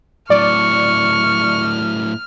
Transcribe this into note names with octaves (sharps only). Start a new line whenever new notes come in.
A2 F#3 D5 C#6 F6